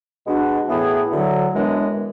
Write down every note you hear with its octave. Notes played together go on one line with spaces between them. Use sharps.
B2 G#3 D4 F#4
A2 E3 B3 E4 G#4
D2 D3 F#3
F#2 E3 G#3 B3 D4